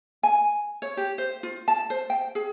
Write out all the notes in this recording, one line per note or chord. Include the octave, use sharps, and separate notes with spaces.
G#5
C#5
G4
C5
F4
A5
C5
G5
G#4